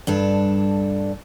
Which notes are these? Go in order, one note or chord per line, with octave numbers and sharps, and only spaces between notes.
G2 D4 A4